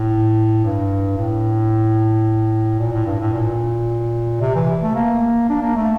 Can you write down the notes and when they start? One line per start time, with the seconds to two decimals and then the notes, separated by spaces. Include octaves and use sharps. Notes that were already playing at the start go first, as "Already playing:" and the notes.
Already playing: A2
0.64 G2
1.18 A2
2.79 A#2
2.93 A2
3.06 G2
3.21 A2
3.33 A#2
4.41 C3
4.55 E3
4.82 A3
4.95 A#3
5.49 D4
5.62 A#3
5.76 A3